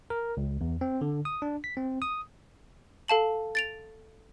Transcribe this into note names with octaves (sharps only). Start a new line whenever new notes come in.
A#4
C#2
E2
C4
D3
D#6
D4
B6
C4
D#6
A4 F5 A5 F#7
A6 D7 F7